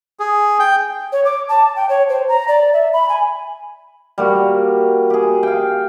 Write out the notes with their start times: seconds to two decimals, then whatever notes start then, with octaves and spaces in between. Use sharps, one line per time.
0.19 G#4
0.59 G5
1.12 C#5
1.25 D6
1.49 A5
1.76 G5
1.89 C#5
2.09 C5
2.28 A#5
2.48 D5
2.73 E5
2.93 B5
3.09 G#5
4.18 G3 A#3 F#4
5.10 G4 G#4
5.43 F5 G5